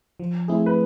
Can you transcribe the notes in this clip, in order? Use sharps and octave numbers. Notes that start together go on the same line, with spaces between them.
F3
A3 C4 E4 G#4
B4